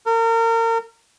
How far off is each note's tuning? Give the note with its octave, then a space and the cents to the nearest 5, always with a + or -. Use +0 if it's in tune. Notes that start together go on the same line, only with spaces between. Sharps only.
A#4 -35